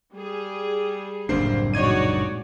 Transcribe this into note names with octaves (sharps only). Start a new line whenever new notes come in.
G3 G#4
F#1 C2 A2 A#3 C4 D4 C5 C7
A#2 G#3 D#4 F#4 C#5 D5 G#6 D#7